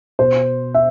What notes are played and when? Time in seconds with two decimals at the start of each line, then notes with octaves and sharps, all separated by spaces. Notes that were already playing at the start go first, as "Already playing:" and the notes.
0.19 B2 C5
0.74 E5